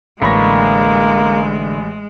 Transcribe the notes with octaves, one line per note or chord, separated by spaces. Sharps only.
A1 D3 G#3 A#3 B5 C#6 A#6